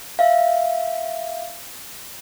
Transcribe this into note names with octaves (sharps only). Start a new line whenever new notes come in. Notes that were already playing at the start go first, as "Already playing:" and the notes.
E5 F5